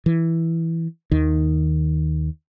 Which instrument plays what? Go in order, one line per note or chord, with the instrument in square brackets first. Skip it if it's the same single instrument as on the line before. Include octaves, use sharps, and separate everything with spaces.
[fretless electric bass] E3
D#2 D#3